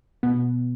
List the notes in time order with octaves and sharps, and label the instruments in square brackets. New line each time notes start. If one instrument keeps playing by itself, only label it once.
[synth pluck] B2 B3